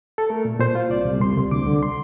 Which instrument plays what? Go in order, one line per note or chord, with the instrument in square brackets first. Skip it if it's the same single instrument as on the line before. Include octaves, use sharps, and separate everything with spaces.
[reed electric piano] A4
A3 A#4
A#2
A#2 C5
F4
C2 D5
C2
C2 C6
C2
D2 D6
D3
C6